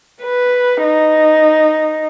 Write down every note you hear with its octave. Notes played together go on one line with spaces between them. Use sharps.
B4
D#4